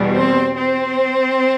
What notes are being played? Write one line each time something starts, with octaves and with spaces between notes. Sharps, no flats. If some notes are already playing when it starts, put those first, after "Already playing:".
Already playing: E2 B2 G3
C4 C5
C4 C5